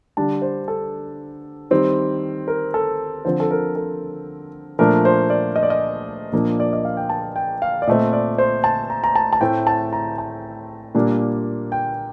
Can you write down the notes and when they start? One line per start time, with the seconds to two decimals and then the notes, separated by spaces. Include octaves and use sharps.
0.17 D3 G3 D4 A5
0.42 C5
0.68 A4
1.71 D#3 G3 C4
2.48 A#4
2.74 A4
3.25 D3 F3 C4 C5
3.40 A4
3.51 A#4
3.76 A4
4.79 A#2 F3 A3 D4 A#4
5.05 C5
5.30 D5
5.56 D#5
5.63 D5
5.70 D#5
6.32 A#2 F3 A#3 D4
6.60 D5
6.73 D#5
6.85 F5
6.97 G5
7.09 A5
7.36 G5
7.62 F5
7.82 D5
7.87 A#2 A3 C4 D#5
8.13 D5
8.38 C5
8.64 A5
8.90 A#5
9.04 A#5
9.16 A5
9.33 A5
9.41 A2 A3 C4 G5
9.67 A5
9.93 A#5
10.18 A5
10.94 A#2 G3 A#3 D4
11.72 G5